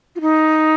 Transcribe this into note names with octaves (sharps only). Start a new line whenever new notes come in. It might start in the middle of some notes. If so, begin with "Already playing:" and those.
F4
D#4